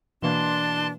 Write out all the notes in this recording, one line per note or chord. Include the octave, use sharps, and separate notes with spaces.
B2 E3 A#3 D4 A5 C6